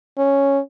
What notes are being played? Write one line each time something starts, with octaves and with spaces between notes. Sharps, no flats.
C#4